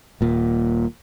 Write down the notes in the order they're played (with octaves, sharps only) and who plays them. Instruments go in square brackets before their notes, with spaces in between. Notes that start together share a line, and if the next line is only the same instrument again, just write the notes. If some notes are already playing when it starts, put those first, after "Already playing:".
[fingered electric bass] D#1 A#2